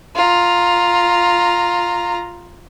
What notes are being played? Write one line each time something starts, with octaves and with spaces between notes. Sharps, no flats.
F4 A#5